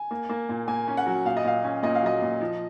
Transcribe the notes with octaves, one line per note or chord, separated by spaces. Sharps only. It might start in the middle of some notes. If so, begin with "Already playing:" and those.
Already playing: G#5
A#3
A#3
A#2
A#3 G#5
C#4
F#5
F#3
A#2 F5
D#5
A#2 F5
C#4
A#2 D#5
F5
F#3 D#5
A#2
F3